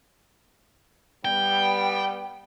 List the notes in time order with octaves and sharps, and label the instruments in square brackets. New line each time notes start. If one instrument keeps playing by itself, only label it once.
[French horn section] G3 B3 [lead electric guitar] G5